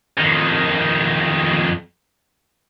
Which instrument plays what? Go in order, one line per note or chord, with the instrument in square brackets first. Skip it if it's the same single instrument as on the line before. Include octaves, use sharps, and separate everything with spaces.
[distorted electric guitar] F2 D#3